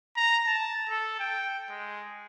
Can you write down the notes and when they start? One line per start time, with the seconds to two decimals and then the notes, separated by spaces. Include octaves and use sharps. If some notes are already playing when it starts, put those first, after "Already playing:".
0.16 A#5
0.46 A5
0.89 A4
1.20 G5
1.70 G#3